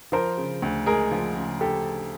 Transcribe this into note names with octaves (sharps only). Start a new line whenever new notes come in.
F3 A#4 C5
C#3
D2
G#3 G#4 A#4
F3
C#3
G4 A4